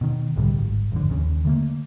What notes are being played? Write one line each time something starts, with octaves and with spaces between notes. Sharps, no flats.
B2 D#3
C2 A2 D3 G3
G#1
G#1 F2 D3
D#2 C#3
D3 A3 A#3